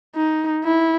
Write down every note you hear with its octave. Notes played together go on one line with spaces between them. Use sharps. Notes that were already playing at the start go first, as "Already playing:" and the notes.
D#4
E4